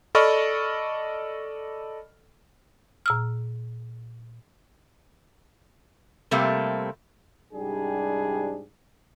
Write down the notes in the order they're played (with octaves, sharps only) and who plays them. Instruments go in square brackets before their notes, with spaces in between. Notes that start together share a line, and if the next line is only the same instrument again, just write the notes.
[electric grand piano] A4 D5 D#5 B5 C#6 F6
[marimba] A#2 E6 F6
[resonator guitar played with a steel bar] C3 G3 A3 A#3 C4
[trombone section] C2 G#2 G3 D4 G4 G#4